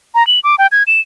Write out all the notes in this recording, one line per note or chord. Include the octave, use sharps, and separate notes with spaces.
A#5
F#7
D6
G5
G#6
E7